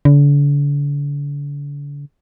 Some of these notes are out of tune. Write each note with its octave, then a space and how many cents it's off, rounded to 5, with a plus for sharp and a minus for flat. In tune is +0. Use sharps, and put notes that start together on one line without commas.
D3 -40